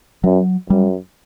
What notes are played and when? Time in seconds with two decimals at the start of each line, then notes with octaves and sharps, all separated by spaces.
0.24 F#2 F#3
0.70 F#2 G3